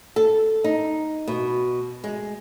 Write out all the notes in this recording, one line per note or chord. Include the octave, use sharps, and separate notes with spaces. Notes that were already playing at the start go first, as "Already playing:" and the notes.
A4
D#4
B2
G#3